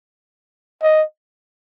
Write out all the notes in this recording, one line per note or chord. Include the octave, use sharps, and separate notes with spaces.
D#5